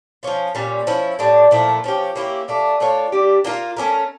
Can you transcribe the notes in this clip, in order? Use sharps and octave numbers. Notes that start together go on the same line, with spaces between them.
F3 C#4 F4
A#2 G3 C#4
F3 C#4 E4
A2 G3 D4
A#2 F3 A3 E4
F3 C#4 G4
A#3 C#4 E4 G4
A3 D4 F4
A3 D4 F4 C#5
G3 D4 G4
A#3 D4 F4 A#4
A3 C#4 G4 A#4